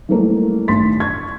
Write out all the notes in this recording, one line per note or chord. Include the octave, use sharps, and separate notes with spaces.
E3 F#3 G3 A3 A#3 A#4
A1 D#3 C6 A6 B6
C#6 G#6